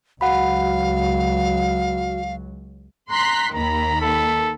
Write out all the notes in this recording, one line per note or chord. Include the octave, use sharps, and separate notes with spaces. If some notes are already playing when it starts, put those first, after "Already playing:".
C#2 F#3 F#4 F5 F#5 B5
A#5 C6 F#6 B6
D#2 D#3 A#5 B5
A4